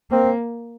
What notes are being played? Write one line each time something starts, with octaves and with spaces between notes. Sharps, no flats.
A#3 C4